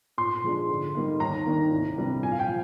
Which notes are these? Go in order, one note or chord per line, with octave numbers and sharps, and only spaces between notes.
A#2 C6
F3 G#3 D4
D3
G3 A#3 D#4
D#2 A#5
D#3 A#3 D4
C2
C3 G3 D4
A#2 G#5
F5
G5
F3